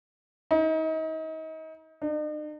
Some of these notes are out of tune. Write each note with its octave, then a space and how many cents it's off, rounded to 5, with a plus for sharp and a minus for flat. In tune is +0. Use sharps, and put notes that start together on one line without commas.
D#4 +35
D#4 -45